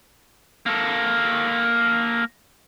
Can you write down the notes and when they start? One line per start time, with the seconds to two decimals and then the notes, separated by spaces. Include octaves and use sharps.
0.66 A#3 A4